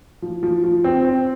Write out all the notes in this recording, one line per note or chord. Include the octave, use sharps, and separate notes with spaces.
F3
F3
F3
C4
C4